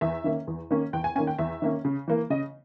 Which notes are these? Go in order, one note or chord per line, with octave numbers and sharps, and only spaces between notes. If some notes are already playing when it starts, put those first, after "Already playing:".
E2 E5
D#3 A#3 C#4
E2
D#3 A#3 C#4
E2 G5
G#5
D#3 A#3 C#4 G#5
G5
E2 E5
D#3 A#3 C#4
C#3
E3 A#3
C#3 D#5